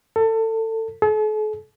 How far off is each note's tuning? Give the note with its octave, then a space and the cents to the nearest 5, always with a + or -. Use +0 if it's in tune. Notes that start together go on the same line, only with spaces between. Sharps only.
A4 +25
A4 -45